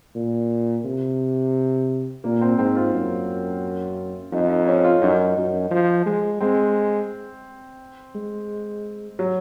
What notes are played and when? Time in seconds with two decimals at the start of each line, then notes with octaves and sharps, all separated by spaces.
0.15 A#2
0.85 C3
2.24 A#2 A#3
2.41 C4
2.58 G#2 C4
2.76 F4
2.94 F#2
4.32 F2 D#4
4.50 D#4
4.67 C#4
4.84 F4
5.01 F#2 D#4
5.37 F#2
5.71 F3
6.06 G#3
6.41 G#3 C4
8.15 G#3
9.19 F#3